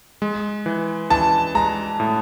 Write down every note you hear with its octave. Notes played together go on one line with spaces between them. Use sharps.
G#3
E3
E3 A5
G#3 A#5
A2